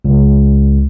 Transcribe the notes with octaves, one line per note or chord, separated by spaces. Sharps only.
C#2